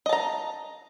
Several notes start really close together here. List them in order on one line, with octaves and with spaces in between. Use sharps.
D#5 A5 A#5